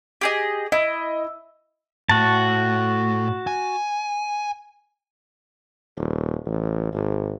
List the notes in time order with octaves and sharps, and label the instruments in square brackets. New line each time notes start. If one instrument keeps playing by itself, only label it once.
[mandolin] G4 G#4 D#5
[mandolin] E4 [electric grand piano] D#5
[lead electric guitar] A2 [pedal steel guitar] F#4 A5
[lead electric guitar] G#5
[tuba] D#1
A1
G#1